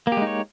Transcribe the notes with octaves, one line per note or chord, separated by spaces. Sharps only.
G#3 A#3 D#4 G4 C#5